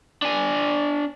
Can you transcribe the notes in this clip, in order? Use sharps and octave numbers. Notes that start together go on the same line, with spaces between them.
D4 G#5